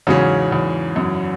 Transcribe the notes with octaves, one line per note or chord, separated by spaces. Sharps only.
E2 G#2 C#3 F#3 C#4
E2
F#2